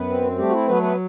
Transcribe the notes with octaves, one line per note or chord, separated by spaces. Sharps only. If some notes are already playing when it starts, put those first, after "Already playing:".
Already playing: F#2 B3 B4
C4
G3 A3 G4
F#4
E4
F#3 B3 B4
B3 B4